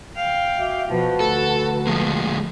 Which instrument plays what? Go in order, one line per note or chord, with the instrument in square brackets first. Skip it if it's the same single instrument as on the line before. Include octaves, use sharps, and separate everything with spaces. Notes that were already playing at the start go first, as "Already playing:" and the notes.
[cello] F5 G5
[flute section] F#4 E5 D6
[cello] B2 F3 [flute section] F#4 B4 A5
[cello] D2 [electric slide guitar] A4
[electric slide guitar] F3 G#3 A#3